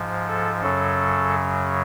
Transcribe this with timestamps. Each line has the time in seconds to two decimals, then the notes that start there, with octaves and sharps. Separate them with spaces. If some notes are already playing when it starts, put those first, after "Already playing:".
Already playing: G#2 F3
0.27 A4
0.62 F#2 C#3 F#3 A4